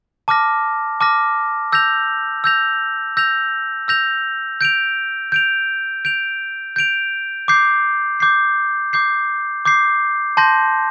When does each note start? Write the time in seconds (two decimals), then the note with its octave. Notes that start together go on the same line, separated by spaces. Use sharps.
0.28 A5 D6 F6 A#6
1.01 A5 D6 F6 A#6
1.72 E6 G6 A#6 F7
2.44 E6 G6 A#6 F7
3.17 E6 G6 A#6 F7
3.88 E6 G6 A#6 F7
4.61 G6 D7 F7
5.32 G6 D7 F7
6.05 G6 D7 F7
6.76 G6 D7 F7
7.48 D6 G6 C7
8.20 D6 G6 C7
8.93 D6 G6 C7
9.65 D6 G6 C7
10.37 A5 C6 G6 A#6